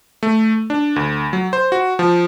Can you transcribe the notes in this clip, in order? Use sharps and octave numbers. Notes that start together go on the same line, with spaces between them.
A3
D4
D2
F#3
C5
F#4
F3